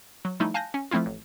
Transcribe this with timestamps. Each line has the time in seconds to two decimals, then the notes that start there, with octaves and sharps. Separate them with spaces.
0.25 F#3
0.40 F3 G3 A3 D#4 E4
0.54 F5 G#5 A5 F#6 G6 A#6
0.74 C#4
0.91 F3 A3 C4 E4 F4
1.06 A1